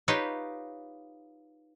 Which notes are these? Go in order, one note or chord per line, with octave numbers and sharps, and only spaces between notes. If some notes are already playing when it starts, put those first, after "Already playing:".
D#4 F4 G4 B4 C#5